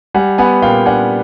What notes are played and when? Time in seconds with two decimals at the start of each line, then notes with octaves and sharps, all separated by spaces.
0.14 G3 F#5 G#5
0.38 B3 F#5 G#5
0.62 A#2 F5 G5
0.86 D4 F#5 G#5